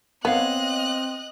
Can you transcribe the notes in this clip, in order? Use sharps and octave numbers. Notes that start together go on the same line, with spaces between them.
B3 C4 C#5 D#5 F5 F#6